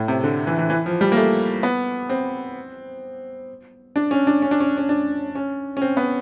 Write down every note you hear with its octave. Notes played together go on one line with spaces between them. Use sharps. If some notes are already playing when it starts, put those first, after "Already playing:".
Already playing: A2
C3
D3
E3
E3
E3
F3
G3
A#3
A3
B3
C4
D4
C#4
D4
C#4
D4
C#4
C#4
D4
C#4
C#4
C4
B3